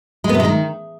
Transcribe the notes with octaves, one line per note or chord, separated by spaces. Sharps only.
G#3
B3
C3
G#3
D#3